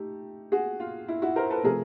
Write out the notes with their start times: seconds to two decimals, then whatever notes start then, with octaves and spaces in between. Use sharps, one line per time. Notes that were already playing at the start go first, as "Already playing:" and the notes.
Already playing: A3 D#4 G4
0.52 F#4 G#4
0.80 F4
1.08 E4
1.22 E4 F#4
1.36 A#4 C5
1.50 A4 B4
1.64 C3 F3 A3 G#4 A#4